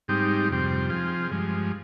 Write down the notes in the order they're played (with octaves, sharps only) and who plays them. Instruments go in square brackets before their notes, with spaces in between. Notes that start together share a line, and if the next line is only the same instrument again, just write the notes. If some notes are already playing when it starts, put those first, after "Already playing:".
[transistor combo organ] G#2 G3 C4 D#4 G4
F2 C3 G3 C4
F3 C4 F4 G#4
G2 F3 G#3